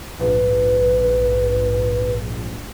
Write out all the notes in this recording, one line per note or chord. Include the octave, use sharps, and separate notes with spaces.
A#1 G#2 F3 B4